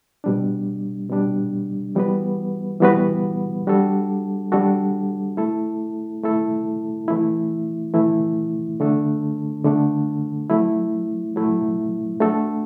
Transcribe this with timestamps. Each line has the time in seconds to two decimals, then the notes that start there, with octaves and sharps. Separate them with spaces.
0.24 B2 G3 D4
1.10 B2 G3 D4
1.95 E3 G3 B3 F#4 B4
2.81 E3 G3 B3 F#4 B4
3.67 G3 D4 F#4 A4
4.52 G3 D4 F#4 A4
5.37 A3 E4 A4
6.23 A3 E4 A4
7.08 E3 A3 E4
7.94 E3 A3 E4
8.80 D3 A3 D4 A4
9.64 D3 A3 D4 A4
10.50 F#3 A3 E4
11.36 F#3 A3 E4
12.21 A3 D4 F#4 A4